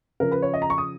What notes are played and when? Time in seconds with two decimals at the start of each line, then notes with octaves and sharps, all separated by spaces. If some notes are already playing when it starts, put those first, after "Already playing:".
0.20 C#3 F3 A#4
0.32 B4
0.42 C#5
0.54 D#5
0.62 A#5
0.70 C#6
0.78 D#6